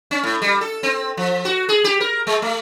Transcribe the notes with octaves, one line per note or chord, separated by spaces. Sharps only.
C#4
A2
G3
A4
C4
F3
F#4
G#4
G4
A#4
G#3
A3